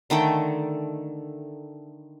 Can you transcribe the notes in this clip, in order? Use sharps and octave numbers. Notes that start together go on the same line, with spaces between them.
D3 D#3 A3 G5